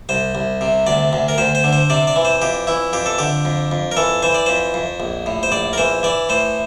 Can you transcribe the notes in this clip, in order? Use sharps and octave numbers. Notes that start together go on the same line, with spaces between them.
C2 C5
C2
C3
D2 D5
D2
A#4
D2 C5
C5
D3
C5
C3 D5
D5
E3
C5
F2 G4
E3 E4
F2 G4
A4
D3 G4
F2
F2
A#4
E3 A4
E3 C5
D5
F2 C5
F2
A#1
A2
C5
A#1 D5
A#4
E3 C5
E3 D5
A2 C5